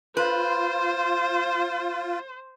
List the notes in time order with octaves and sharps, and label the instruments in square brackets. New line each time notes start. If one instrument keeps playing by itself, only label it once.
[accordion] F4 [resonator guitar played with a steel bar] B4 [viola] C5